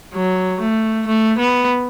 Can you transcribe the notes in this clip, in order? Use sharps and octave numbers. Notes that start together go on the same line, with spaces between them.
F#3
A3
A3
B3